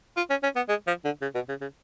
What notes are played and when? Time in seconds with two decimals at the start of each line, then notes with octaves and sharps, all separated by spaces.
0.17 F4
0.30 C#4
0.43 C#4
0.56 B3
0.69 G#3
0.87 F3
1.05 D3
1.22 C#3
1.35 B2
1.49 C#3
1.61 C#3